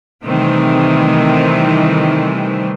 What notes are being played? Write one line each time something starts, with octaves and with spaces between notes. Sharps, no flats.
C3 D#3 E3 G3 A3 C4